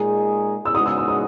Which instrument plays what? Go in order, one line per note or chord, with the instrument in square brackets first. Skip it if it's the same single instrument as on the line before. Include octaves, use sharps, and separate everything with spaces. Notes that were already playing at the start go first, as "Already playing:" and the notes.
Already playing: [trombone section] A#2 G#3 D#4 G#4
[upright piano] E6
[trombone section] C#3 G#3 B3 D#4 F#4 [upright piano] D#6
[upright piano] E6
E6
D#6